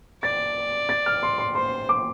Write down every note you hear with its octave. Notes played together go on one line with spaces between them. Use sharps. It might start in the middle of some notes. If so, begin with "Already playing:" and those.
D5 A6
A6
F6
C6
C6
C5 C6
D6